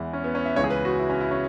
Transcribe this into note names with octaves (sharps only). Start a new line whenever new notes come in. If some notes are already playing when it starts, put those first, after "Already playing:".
Already playing: E2 E3 G#3 E4
C#4
B3
C#4
E5
C#2 C#3 E3 G#3 C#5
G#4
B4
F#4
E4
C#4
E4
C#4